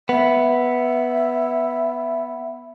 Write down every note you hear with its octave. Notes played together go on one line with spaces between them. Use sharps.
B3 E5